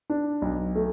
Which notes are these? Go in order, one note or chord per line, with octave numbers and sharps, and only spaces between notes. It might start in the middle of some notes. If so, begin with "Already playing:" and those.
D4
B1
A3